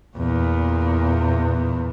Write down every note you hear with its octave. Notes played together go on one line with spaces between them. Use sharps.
E2 A#2